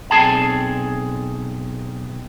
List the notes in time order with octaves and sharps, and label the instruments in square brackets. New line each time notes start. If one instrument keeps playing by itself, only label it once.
[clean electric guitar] B1 C4 G#4 A5